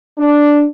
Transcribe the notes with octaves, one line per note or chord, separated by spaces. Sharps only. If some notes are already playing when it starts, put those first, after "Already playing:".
D4